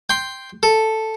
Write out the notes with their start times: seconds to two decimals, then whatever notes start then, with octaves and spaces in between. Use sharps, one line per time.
0.10 G5 C6
0.63 A4